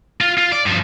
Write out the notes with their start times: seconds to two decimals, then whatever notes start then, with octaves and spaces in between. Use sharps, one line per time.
0.21 F4
0.38 F4
0.52 D5
0.66 G2 F3